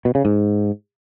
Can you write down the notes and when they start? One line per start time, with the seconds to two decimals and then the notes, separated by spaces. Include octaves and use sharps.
0.05 B2
0.15 C#3
0.25 G#2